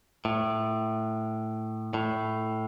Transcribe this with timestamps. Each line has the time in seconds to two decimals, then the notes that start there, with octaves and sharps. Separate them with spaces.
0.25 A2
1.94 A2